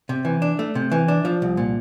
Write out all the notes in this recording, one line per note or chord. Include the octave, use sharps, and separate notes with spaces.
C3
E3
D4
A3
C3
E3
D4
F3
C2
A#2